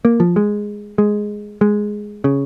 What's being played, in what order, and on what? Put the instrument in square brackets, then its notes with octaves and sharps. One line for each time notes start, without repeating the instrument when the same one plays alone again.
[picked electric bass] A#3
F3
G#3
G#3
G#3
C#3